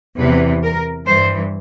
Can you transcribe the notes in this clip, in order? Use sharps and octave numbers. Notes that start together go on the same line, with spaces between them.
E2 C3 E3 B4
A#4
G2 E3 C5